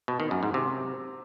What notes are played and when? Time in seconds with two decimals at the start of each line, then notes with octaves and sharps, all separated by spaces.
0.08 B2
0.20 D#3
0.31 F#2
0.43 G#2
0.54 C3